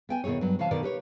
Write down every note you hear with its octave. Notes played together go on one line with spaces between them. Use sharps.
B3 G5 G#5
D#2 B2 E4 G#4 C#5
G2 F#3
C3 E3 C#5 F5 A5
B2 D3 D#3 A#4 D5
G4 B4 C#5